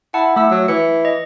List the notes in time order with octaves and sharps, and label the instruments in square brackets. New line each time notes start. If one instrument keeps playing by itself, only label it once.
[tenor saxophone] E4 [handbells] F#5 A5
[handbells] A3 E6 [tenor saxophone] E4
[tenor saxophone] F#3
[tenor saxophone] E3 [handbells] C#7
[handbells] D#5